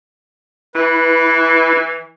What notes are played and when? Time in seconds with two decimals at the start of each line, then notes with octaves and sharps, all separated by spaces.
0.75 E3 E4 B4 B5